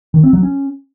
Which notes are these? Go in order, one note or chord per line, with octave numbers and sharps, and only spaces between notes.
D#3
C4
F#3
C#4